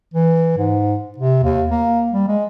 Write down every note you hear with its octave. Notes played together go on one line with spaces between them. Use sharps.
E3
G#2
C3
D#2
A#3
G3
G#3